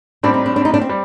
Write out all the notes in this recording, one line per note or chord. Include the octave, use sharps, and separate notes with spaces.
A2 G3 C4 D4
D#4
D4
D4
D#4
D4
C4
G3